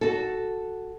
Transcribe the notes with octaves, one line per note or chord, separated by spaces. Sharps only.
F#4 A4